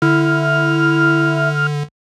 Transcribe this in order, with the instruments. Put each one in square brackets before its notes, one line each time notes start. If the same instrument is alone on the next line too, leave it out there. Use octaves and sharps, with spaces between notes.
[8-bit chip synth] D3 [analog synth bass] E4 [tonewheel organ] F6